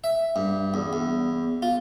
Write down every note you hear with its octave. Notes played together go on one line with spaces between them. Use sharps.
E5
G2
E2
E2
F4